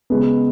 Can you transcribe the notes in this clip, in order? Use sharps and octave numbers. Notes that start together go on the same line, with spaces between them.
C#3 G#3 B3